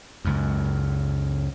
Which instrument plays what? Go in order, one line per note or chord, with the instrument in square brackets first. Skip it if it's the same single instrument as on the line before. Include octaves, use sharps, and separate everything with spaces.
[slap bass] C#2 F#2